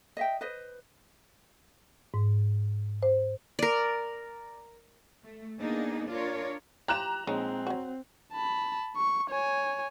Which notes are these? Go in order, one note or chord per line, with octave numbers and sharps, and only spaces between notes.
D#5 E5 G5
B4 C5 D#5
G#2
C5
A#4 D5
A3
A#3 B3 D4 D#4 G#4
D4 F4 A#4 C#5
E3 F3 F4 G4 A#5 F#6 E7
A#1 G#3 C4 D#4 C#5
F#3 F#4
A5 B5
C#6
C#5 G#5